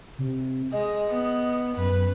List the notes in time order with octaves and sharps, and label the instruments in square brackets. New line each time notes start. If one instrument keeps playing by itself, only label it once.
[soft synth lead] C3
[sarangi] G#3 [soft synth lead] D#5
[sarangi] B3
[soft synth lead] F#2 [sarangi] B4